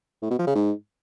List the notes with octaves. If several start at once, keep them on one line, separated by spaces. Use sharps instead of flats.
A2
B2
F3
C#3
G#2